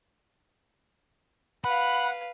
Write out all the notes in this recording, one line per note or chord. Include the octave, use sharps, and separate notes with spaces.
B4 F5 F#5 B5